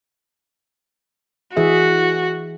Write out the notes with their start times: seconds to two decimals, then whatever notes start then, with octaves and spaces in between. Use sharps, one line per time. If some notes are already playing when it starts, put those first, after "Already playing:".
1.57 E3 F#4 G#4 E5